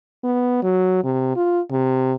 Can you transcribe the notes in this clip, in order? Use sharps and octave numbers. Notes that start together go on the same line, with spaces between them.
B3
F#3
C3
F4
C3